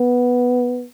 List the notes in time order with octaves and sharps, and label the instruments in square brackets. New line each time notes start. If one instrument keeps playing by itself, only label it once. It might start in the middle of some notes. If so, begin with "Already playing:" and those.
Already playing: [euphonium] B3